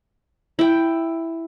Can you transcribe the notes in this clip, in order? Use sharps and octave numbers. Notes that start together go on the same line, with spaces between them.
E4 G5